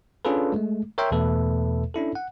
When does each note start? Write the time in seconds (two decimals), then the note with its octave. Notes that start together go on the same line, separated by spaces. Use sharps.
0.25 C#4 D4 F4 G#4 A4 B4
0.52 G#3 A3
0.98 A#4 C#5 E5 G5 C6
1.12 E2 B2 A3 A4 B4 E5
1.94 C#4 D4 E4 A4
2.15 F#5